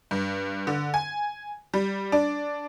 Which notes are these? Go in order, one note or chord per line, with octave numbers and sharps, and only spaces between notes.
G2
D3
G#5
G3
D4